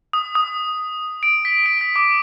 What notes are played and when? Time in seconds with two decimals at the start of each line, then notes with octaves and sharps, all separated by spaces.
0.13 D#6
0.35 D#6
1.23 D7
1.45 B6
1.66 D7
1.81 B6
1.96 D6